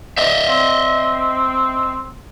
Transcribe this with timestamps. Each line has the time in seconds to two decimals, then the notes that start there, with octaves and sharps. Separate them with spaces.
0.18 D#5 E5
0.48 C4